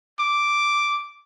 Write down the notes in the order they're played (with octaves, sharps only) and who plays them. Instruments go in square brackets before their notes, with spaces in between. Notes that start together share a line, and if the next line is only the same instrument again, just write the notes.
[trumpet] D6